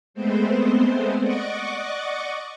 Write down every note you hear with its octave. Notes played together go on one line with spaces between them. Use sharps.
G#3 A3 B3 C4 C5
D5 D#5 F#5 C#6 D6